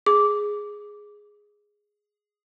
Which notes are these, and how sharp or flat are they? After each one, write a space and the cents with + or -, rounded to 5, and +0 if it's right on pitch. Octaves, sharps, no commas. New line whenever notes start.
G#4 +0 D6 -10